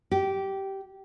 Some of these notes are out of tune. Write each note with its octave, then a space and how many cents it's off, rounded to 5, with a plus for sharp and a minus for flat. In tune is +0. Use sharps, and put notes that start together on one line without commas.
G4 -15